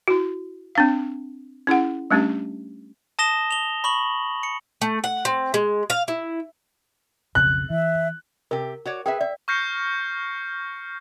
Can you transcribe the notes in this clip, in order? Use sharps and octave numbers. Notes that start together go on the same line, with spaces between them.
E4 F#4
C4 D4 F5
C#4 E4 G#4 F#5
G3 A3 C#4 D4 G4
A5 D#6 A#6 E7 G7
F7 G7
B5 C#6 F#7
C#7
A3
F#5
C4
G#3
F5
E4
B1 F2 C#3 F#6
E3 E5
C3 G4 A#4
F#4 C#5 D5
G#4 B4 E5 G5
D5 E5
C#6 F6 G6 A#6 C7 C#7